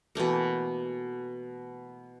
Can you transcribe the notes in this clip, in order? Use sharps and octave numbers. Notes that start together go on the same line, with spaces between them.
B2 E3 A3 A#3